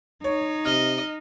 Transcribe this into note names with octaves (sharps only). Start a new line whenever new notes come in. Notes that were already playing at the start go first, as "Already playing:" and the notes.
D#4 C#5
C3 D#5 F6